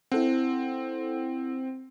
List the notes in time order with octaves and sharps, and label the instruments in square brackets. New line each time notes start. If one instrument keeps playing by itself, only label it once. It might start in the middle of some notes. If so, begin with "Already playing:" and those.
[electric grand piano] C4 [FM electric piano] E4 A4 F#5